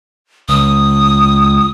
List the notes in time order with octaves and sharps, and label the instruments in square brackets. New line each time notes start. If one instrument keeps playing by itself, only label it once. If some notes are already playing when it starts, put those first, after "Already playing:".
[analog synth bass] C#2 [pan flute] D#6